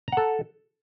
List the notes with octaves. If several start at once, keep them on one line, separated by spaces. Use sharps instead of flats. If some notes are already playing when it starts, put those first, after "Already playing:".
A4 F#5 A#5